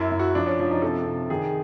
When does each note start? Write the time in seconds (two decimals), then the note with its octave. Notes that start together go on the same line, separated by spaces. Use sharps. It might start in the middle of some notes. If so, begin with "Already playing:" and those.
Already playing: F#2 E4
0.11 F#2
0.19 F#4
0.35 F3 D4
0.47 C#4
0.59 F3 D4
0.71 D#4
0.82 C3 A4
1.06 C3
1.30 D#3 G#4